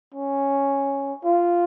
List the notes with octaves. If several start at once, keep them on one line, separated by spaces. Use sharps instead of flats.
C#4
F4